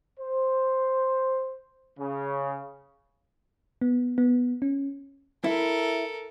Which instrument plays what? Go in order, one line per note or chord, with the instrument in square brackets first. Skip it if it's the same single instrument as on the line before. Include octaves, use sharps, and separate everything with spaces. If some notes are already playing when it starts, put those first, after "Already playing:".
[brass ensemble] C5
C#3
[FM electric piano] B3
B3
C#4
[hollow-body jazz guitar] E4 [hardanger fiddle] A4 A#4